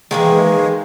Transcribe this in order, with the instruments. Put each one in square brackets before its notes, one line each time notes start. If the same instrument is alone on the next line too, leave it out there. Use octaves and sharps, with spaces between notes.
[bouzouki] D#3 A#3 G#4 [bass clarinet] E3 [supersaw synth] G#3